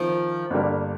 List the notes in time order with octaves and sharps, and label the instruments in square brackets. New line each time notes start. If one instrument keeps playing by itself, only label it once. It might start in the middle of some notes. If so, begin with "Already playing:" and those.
Already playing: [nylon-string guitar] D#3 F3 [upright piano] C4
[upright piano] G1 G2 D3 G3 A#3